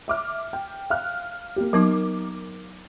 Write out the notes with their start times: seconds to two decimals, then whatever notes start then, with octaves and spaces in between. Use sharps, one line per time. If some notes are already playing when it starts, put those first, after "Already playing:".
0.08 E5 D6 F6
0.53 G5
0.90 F5 F6 F#6
1.56 A#3 G4
1.73 F#3 B3 D#4 A#4 D6